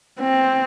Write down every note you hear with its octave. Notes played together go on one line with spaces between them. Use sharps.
C4